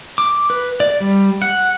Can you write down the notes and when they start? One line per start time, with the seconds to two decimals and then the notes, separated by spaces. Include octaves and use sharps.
0.18 D6
0.50 B4
0.80 D5
1.00 G3
1.42 F#5